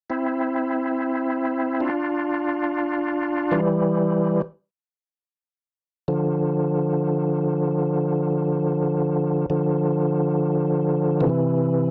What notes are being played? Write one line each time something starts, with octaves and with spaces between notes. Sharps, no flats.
C4 E4
D4 F4
E3 G3
D3 F3
D3 F3
C3 E3